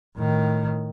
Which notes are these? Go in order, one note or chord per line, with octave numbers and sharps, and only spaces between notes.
A2 D#3